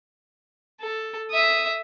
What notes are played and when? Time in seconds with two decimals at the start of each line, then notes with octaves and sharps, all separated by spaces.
0.81 A4
1.31 E5 D#6